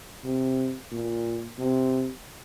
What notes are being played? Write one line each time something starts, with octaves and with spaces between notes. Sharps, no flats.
C3
A#2
C3